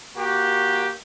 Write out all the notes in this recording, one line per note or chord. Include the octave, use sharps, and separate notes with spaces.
A#3 F#4 G4